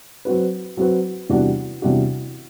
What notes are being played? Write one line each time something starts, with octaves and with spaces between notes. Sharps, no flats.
F#3 C4 F#4 B4
F#3 C4 F#4 B4
E2 C3 G3 D4 F#4
E2 C3 G3 D4 F#4